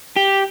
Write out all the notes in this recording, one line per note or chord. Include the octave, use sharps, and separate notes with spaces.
G4